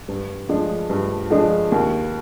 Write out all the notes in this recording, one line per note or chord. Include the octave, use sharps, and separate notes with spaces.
G2
F3 G#3 D4
G2
F3 G#3 D4
D#2